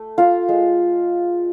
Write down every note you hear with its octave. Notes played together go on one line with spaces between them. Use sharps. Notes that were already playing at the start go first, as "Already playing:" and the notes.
Already playing: A3
F4 F5
G#3